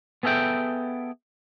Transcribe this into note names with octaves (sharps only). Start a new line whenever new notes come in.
B3 G#4 A4 E5 G5